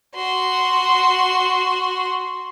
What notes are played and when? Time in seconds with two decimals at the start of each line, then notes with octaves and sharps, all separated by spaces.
0.15 F#4 C6